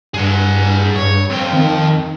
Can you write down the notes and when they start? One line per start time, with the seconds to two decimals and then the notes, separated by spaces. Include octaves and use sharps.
0.14 G2 G#4 F#5
0.96 G2 C#5
1.30 F2 C4 G5
1.53 D#3